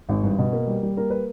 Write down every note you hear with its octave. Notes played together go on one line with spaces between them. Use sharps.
G#1
G2
B2
A#3
G3
G3
A#3 A#4
B4